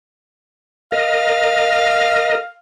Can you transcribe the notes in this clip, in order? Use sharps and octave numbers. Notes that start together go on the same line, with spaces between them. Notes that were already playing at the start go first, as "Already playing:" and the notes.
A#4 D#5 F5